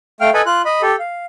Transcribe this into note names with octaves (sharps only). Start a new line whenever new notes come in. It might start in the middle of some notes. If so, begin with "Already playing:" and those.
A3 F5 G5 F6
A4 B4 D#5 G#5 B5
F4 F#6
D#5 B5
G4 A4
F5